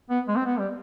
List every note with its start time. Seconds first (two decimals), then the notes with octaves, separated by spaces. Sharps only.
0.10 B3
0.28 G#3
0.37 C4
0.46 B3
0.59 G3